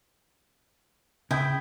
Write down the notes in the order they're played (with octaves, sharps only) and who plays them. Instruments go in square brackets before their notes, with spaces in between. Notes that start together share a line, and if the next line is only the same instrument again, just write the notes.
[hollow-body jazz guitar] C#3 [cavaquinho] E4 [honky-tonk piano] G5 D#6 G6